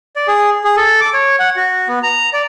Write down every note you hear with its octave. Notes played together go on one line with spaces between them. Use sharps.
D5
G#4
G#4
A4
D6
C#5
F#5
F#4
B3
A#5
D5